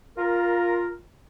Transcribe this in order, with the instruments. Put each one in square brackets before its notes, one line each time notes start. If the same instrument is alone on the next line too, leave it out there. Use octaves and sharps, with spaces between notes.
[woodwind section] F4 A#4